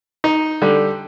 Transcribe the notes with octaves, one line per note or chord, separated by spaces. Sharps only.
D#4
D3 G3